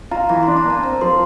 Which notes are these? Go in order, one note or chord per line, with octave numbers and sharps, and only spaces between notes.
F4 A#5
E3 A#5
C6
D4
A#5
A#3 A5
C4 A#5
F3 C6